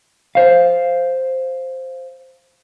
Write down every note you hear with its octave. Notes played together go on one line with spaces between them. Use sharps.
C5 F5